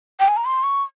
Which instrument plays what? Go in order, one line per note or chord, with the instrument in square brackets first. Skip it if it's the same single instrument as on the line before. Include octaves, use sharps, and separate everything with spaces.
[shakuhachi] G5
G#5
A#5
C6
C#6